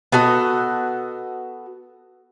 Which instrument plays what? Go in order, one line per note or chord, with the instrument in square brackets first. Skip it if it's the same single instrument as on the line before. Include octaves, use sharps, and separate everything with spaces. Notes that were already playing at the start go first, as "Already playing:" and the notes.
[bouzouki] B3 F#4 A4 D#5